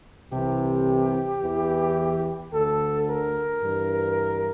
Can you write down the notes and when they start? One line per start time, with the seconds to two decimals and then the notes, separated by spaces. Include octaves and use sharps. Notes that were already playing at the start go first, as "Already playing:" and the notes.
0.30 C2 C3 E3 G4
1.41 E2 E3
2.52 D2 D3 A4
3.09 A#4
3.63 G2 E3